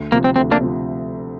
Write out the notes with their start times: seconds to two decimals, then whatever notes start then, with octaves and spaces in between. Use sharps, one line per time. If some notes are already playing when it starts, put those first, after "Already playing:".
Already playing: D2
0.12 C3 A#3
0.15 F3
0.24 C4
0.36 D2 C4
0.51 A#3 D4
0.60 C3 F3